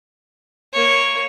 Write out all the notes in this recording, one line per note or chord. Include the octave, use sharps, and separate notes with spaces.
A#3 C#5